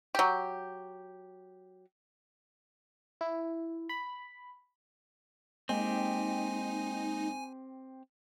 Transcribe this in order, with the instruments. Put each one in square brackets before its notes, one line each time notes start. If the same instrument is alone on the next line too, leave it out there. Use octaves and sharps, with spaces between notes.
[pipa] F#3 G4
[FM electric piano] E4
B5
[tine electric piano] G#3 A#3 D#5 [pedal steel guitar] C4 G4 [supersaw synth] D#4 [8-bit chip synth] G#5